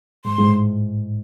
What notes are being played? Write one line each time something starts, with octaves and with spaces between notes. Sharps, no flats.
G#2 C6
G#2
A2